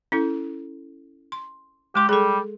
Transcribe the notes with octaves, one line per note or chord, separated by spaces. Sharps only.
C#4 E4 A4
C6
G#3 G4 C6
G3 G#4 A4